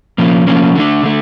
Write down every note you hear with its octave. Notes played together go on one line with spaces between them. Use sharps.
F3 A#3 C#4
F3 A#3 C#4
D3 A3 D4
D3 A3